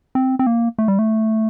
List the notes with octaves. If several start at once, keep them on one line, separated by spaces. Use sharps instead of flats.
C4
C4
A#3
A3
G3
A3